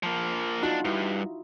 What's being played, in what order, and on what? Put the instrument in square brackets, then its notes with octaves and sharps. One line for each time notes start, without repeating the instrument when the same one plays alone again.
[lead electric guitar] F3 A#3
[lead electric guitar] B1 D4 [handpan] D#4 F4 F#4
[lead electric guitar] G2 [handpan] E4